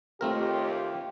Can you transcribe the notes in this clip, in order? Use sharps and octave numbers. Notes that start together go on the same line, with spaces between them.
D#2 A3 C4 F4 G4 A#4